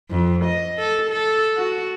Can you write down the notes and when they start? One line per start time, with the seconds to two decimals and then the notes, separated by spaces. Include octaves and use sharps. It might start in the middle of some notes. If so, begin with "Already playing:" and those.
0.10 F2
0.44 D#5
0.78 A4
1.09 A4
1.56 F#4